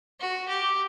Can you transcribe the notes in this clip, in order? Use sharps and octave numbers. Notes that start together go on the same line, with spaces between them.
F#4
G4